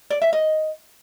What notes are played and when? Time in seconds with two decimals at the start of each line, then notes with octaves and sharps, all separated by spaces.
0.10 D5
0.22 E5
0.33 D#5